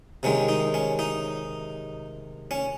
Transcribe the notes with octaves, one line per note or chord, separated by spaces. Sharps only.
C3 D#3 G#3 C#4
D#4
C#4
D#4
C#4